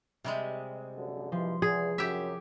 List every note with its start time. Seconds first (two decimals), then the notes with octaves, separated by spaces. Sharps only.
0.24 C3 G3 G#3 G4
0.95 A#1 F#2 D3
1.32 G2 B2 E3 F3 C6
1.62 E2 G#4
1.98 F#2 G4 E5